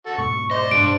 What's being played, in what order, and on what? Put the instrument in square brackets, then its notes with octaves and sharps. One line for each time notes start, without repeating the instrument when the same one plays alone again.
[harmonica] F#4 A4
[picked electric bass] G#2 B2 [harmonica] C#6
[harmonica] C5 D5 [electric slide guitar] D#5
[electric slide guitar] G2 D4 [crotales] D7